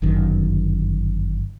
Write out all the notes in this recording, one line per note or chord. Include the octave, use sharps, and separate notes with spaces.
G1 F#2 D#3